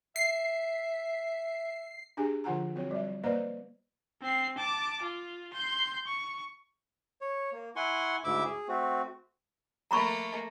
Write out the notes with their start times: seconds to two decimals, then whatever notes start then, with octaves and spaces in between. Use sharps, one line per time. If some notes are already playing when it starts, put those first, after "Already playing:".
0.16 E5 C7
2.17 D4 G4 G#4 G#5
2.44 D3 F3 F4 F#5 G#5 A#5
2.75 F#3 C4 F#4 C#5
2.91 G3 E5
3.24 A#3 B4 C5 D5 D#5 A#5
4.21 C4 C7
4.58 A5 D6
5.02 F4
5.54 C6 G6
6.07 C#6
7.21 C#5
7.52 A#3
7.76 E4 F#5 G#5 C6 C#6
8.24 D2 G#2 E4 E5 D6 E6
8.44 G#4
8.68 A3 C4 F#4
9.91 A3 A#3 A#5 B5 C#6